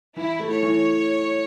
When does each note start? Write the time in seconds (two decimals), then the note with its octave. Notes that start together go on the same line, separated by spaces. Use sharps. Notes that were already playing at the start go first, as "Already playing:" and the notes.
0.16 E3 E4
0.40 A3
0.51 C#5
0.62 E3